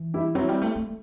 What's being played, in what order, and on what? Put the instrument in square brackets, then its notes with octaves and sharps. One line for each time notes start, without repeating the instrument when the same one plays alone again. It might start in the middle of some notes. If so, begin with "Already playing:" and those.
Already playing: [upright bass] E3
[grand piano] E4 G4
[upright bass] F#3 [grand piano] C4 E4
[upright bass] G3
A3
A3